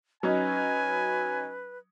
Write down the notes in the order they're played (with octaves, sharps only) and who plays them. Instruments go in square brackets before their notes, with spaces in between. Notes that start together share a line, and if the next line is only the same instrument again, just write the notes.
[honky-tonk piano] F#3 C#4 D#4 [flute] B4 [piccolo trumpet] G#5